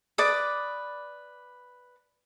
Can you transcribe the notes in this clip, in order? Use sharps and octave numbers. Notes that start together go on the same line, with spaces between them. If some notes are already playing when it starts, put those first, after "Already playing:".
B4 D5 D6 D#6